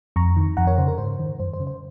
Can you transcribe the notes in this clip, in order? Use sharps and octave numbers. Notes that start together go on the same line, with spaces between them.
F2 A#5 C#6
D#3
F2 F#5 A#5
A#4 C#5
C#3 C5
A#4
G#2 C5
D#3
F#2 C5
C5
C#3
C5